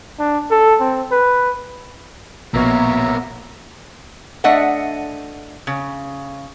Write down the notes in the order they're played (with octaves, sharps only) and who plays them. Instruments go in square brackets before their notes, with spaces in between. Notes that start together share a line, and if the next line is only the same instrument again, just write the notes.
[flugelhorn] D4
A4
C4
B4
[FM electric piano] A#1 B2 C#5 [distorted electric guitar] A#3 B3 [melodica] E5 A#5
[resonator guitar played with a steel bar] A3 D4 D#5 E5 F#5
C#3